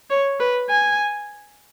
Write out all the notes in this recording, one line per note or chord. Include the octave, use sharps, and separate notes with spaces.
C#5
B4
G#5